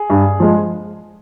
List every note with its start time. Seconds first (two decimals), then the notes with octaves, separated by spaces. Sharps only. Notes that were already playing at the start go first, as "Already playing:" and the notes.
Already playing: G#4
0.10 G2
0.40 F3 G#3